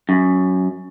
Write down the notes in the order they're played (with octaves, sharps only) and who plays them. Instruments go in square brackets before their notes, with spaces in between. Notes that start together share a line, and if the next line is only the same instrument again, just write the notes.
[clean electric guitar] F#2